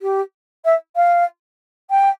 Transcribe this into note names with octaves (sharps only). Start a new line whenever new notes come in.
G4
E5
F5
G5